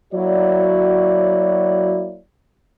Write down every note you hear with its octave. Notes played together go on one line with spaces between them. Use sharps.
F#3 A#3 E4 F#4 C#5 D5